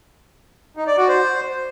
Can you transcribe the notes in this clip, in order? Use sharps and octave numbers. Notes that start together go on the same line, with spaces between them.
D#4
D5
F#4
C5